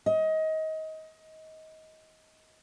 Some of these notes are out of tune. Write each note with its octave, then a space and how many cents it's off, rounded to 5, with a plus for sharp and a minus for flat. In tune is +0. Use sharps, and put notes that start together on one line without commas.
D#5 +25